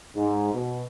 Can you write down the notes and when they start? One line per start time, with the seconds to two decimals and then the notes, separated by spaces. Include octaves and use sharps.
0.16 G#2
0.53 B2